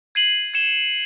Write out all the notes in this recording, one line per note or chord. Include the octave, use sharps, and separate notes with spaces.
G#6 C7 D#7 F#7
G#6 C#7 E7 G7